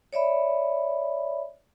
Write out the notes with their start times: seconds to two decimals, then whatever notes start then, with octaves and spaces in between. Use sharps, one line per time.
0.13 C#5 D5 E5 B5